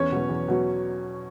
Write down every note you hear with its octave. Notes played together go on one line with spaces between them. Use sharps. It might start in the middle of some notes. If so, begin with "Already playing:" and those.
Already playing: E2 C#4 C#5
B2 F#3
E2
B2 F#3